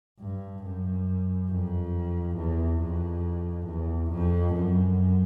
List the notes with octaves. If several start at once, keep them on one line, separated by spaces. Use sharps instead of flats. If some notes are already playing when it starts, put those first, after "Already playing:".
G2
F#2
F2
E2
F2
E2
F2
F#2